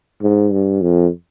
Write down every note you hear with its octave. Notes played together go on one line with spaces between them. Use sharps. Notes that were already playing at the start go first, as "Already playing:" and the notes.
G#2
G2
F2